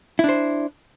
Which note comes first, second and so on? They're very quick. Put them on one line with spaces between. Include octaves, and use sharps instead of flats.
E4 D4 C5